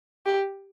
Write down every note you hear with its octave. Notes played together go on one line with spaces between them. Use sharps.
G4